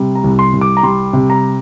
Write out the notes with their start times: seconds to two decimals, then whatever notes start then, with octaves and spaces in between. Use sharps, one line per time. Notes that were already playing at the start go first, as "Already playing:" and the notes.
Already playing: C3 G3
0.15 A#5
0.24 C2
0.39 C6
0.53 C2
0.61 D6
0.77 A#5
0.83 G3 C6
1.13 C3
1.30 A#5